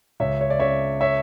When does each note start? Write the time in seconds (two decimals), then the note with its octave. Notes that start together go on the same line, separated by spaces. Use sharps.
0.20 C#2 C#5 E5
0.41 C#5
0.50 D5
0.59 C#3 C#5 E5
1.01 C#5 E5